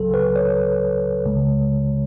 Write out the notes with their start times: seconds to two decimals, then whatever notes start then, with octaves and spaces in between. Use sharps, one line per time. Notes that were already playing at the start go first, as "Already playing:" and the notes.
Already playing: C#2 C#3 F#3 A4
0.14 B4
0.36 C#5
1.25 C#2 C#3 G#3